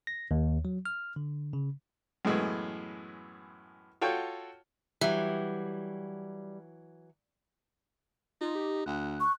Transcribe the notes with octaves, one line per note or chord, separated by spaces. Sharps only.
A#6
D#2
F#3
F6
D3
C#3
F#2 A2 E3 G#3 B3
F4 F#4 A4 C#5 G5
E3 F#3 G3 E5
D#4 F4
G4
D2 F#6
C#6